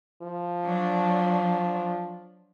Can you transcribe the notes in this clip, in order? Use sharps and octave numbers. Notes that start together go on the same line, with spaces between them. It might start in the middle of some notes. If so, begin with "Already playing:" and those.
F3
F#3 D4